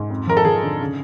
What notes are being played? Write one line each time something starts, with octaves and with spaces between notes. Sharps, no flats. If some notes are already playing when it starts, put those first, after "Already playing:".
Already playing: G#2
F2
F3 A#4
A4
F3 G#4
D3
C#3